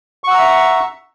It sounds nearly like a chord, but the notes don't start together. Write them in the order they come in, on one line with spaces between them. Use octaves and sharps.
C#6 F#5 E6 A#5 E5